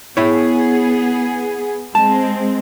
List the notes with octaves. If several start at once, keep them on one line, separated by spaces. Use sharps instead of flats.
B3 E4 G#4 C#5
G#3 C4 A5